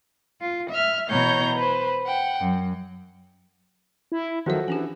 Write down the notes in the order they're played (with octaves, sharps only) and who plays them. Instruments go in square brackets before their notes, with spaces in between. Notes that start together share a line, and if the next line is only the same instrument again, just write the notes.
[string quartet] F4
E5 F6
B2 E3 C#5 A#5 G6
B4 C5
F#5 G5
F#2
[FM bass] E4
[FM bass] D#3 [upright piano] F3 F#4 A4 [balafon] F#3 E5
[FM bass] E3 [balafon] C#4 D4 G4